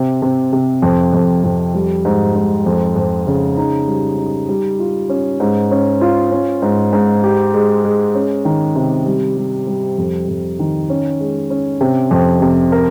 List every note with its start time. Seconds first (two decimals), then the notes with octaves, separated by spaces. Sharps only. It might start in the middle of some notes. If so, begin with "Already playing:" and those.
Already playing: C3
0.22 C3
0.53 C3
0.82 F2
1.13 F2
1.44 F2
1.74 G3
2.05 G#2
2.35 G#2
2.66 F2
2.96 F2
3.27 C#3
3.57 D#4
3.88 G3
4.18 D#4
4.49 G3
4.79 F4
5.09 C#4
5.40 G#2
5.71 C#4
6.01 F4
6.32 C#4
6.62 G#2
6.93 G#2
7.24 G4
7.54 G#3
7.84 G#3
8.15 C#4
8.45 D#3
8.76 C3
9.06 G3
9.36 G3
9.67 G3
9.98 F2
10.28 F2
10.59 D#3
10.90 C#4
11.20 G#3
11.50 C#4
11.81 C3
12.11 F2
12.42 C3
12.72 A#4